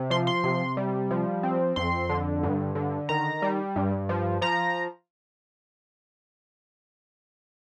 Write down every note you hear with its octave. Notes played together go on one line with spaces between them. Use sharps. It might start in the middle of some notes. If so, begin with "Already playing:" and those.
Already playing: C3
F3 C6
C6
C3
G3
F3
C4
F2 C6
D3
G2
D3
D#3 A#5
G3
G2
F3
F3 A#5